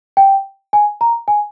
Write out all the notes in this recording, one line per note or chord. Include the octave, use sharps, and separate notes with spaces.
G5
G#5
A#5
G#5